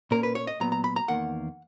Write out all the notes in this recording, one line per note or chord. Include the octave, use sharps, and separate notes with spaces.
A#2 A#3 C#4 A#4
B4
C#5
D#5
A#2 F#3 B3 A#5
A#5
B5
A#5
E2 D#3 A#3 F#5